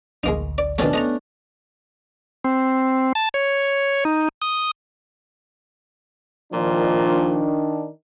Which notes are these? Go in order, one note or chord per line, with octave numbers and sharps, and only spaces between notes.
A1 D2 G#3 A#3 D#4
D5
B2 D#3 A3 C#4 D4
A3 B3 D#5 A5 A#5
C4
A5
C#5
D#4
D#6
A#2 D#3 F3 D4